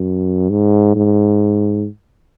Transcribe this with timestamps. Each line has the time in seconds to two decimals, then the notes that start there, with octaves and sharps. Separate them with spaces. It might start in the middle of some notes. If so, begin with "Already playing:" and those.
Already playing: F#2
0.50 G#2
0.95 G#2